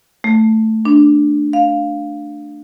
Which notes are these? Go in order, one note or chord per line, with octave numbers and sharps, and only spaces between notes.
A3
D4
F5